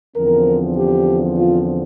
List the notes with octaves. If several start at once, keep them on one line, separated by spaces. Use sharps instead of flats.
E2 D3 F3 C4 A#4
G4
F4